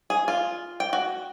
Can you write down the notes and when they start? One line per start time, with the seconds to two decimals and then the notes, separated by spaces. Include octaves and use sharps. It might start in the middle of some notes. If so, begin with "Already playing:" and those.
0.10 G#4
0.28 F4
0.80 G5
0.93 F#4